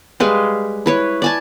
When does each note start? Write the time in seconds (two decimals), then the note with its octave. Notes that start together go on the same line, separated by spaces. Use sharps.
0.20 G3 G#3 B4 F5
0.86 E4 B4 C#5
1.22 D5 G#5 A5